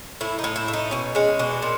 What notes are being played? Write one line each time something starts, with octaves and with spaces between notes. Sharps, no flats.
A2 E4
D#4
A2
E4
A3
D#4
B2 C#4
G#3 C#4
B2 D4
A#2